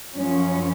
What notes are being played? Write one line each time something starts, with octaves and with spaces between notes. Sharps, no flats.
F#2 F3 C#4